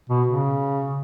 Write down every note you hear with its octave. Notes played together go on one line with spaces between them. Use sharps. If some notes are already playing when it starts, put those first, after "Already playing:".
B2
C#3